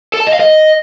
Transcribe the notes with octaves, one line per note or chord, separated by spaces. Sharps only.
A4
A5
D#5
F5
D#5